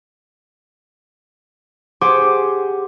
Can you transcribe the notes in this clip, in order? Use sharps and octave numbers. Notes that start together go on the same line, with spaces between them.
G4 G#4 C5 F#5 C6 D6